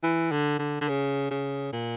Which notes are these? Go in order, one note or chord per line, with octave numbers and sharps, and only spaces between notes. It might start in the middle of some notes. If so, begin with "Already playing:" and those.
E3
D3
D3
D3
C#3
C#3
A#2